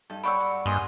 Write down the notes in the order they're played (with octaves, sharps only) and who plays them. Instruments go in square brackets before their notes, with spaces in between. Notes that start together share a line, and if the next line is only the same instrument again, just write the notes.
[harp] G2 D#4 A4
[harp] B4 D5 [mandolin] C#5 F#5 G5 [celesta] B5 C#6 E6
[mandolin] F#4
[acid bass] G2 [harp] A#3 [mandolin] G#4 D#5 C6